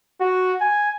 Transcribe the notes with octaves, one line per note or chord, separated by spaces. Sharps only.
F#4
G#5